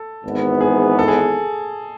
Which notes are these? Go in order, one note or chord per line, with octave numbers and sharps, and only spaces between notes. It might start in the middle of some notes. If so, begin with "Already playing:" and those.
Already playing: A4
G#1 G#2 E3 B3
G#4
A4
G#4